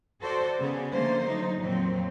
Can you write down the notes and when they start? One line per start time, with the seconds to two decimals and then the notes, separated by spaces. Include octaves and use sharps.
0.21 F#4 A4 C5 D5
0.59 C#3 B3 G#4
0.93 D3 F3 A3 A#3 C5
1.25 F#3 D#4
1.59 F2 A#2 F#3 C4